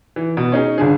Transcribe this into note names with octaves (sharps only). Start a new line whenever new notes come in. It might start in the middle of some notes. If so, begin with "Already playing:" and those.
E3
B2
C#4 D#4 G#4
G1 D3 G#4